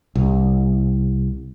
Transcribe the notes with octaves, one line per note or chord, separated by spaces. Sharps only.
C2